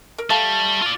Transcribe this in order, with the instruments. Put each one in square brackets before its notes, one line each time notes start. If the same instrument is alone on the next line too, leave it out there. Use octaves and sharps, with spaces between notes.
[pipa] A#4
[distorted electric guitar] G3 [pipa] A3 F5 A5
[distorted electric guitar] F4 D5